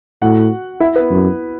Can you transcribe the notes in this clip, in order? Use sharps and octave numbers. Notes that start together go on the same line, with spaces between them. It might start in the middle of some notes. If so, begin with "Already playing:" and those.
A2 F#4 F#5
E4 E5
B3 B4
F#2